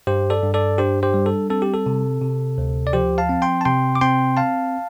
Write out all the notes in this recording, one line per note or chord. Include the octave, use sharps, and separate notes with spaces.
G2 G4 C5
A4 D5
G2
A4 D5
D4 G4 C5
G4 C5
G3
A4
C4 A4
G4
A4
C3
C3
D2
D5
F3 G4 C5
F5 A5
C4
G5 C6
A5
C3 G5 C6
D6
C4 G5 C6
F5 A5